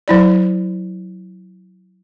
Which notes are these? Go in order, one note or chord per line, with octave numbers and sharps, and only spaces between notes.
F#3 E4 D5